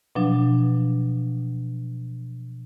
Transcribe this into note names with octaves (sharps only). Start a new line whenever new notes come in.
B2 F3 F#3 D4